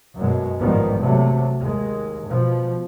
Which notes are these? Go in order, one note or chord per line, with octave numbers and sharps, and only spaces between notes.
F#2 B2 G#3
A1 G#2 D#3 F3 G3 B3
C3 F#3 A3
D#2 G#3
B2 F3